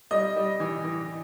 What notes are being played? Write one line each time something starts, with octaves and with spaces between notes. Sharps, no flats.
G3 D#5
G3
E3
E3